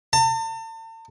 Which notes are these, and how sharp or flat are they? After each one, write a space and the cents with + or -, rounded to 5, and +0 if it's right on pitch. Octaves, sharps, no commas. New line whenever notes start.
A5 +40